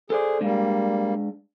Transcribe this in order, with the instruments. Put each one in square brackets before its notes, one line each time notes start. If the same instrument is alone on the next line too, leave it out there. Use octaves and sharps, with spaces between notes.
[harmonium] G#4 [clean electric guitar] A4 C5 D5
[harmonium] G3 A#3 [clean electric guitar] G#3 D4